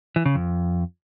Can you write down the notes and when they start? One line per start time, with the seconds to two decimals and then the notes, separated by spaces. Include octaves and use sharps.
0.16 E3
0.26 C#3
0.35 F2